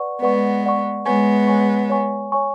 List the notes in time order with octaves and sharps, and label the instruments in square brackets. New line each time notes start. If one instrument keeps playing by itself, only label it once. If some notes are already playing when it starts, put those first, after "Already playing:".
Already playing: [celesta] B4 D5 F#5 C#6
[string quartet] G#3 B3 [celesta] B4 D5 F#5 C#6
[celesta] B4 D5 F#5 C#6
[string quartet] G#3 B3 [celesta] C#5 G#5 C#6
[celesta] C#5 G#5 C#6
C#5 G#5 C#6
C#5 G#5 C#6